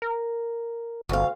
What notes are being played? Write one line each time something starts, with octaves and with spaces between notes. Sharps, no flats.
A#4
G1 D2 F5